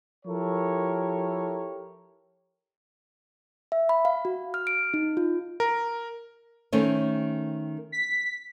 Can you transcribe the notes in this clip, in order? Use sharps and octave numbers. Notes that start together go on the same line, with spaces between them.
F3 E4 G4 A4 A#4 C#5
E5
B5
F5
F#4
F6
D7
D#4
F4
A#4
D#3 A3 C4 C#4
B6